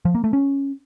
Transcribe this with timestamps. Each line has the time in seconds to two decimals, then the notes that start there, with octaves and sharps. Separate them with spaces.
0.05 F3
0.15 A#3
0.24 A3
0.33 C#4